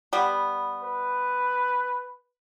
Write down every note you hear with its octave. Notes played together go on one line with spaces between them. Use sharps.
G3 B3
B4